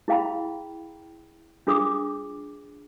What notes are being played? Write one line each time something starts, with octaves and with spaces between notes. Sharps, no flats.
E4 G#4 F5 G5 A#5 B5
D4 F4 G#4 D6 D#6